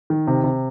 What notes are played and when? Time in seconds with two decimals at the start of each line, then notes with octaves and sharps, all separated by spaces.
0.10 D#3
0.27 C3
0.44 C3